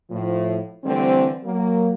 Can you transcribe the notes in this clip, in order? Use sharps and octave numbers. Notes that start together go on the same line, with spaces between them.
A2 F3
D3 E3 G3 A3 C4
F#3 A#3